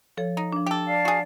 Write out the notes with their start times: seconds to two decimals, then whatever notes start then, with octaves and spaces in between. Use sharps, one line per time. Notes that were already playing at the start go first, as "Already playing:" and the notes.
0.17 F3 A4 C#5
0.37 D#4
0.53 F3 D4
0.66 G4 A4
0.86 D5 F5 A5
1.05 F#4 G#4